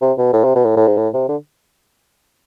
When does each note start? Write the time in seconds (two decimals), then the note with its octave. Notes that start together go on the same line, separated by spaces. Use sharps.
0.02 C3
0.18 B2
0.33 A2
0.44 C3
0.56 B2
0.65 A2
0.77 A2
0.87 G#2
0.98 A2
1.14 C3
1.29 D3